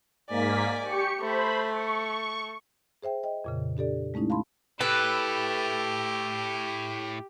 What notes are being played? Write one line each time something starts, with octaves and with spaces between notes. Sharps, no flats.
G#2 A#3 D5 G#5 B6
G4 C#6 C#7
A3 C5 B5
C#6
G#4 C5 E5 G5
D#5 G5
F2 A#2 C#3
D4 G4 A4 D5
G#3 A3 C#4 D#4 E4
F5 A5 B5 C6
A2 G4 A4 B4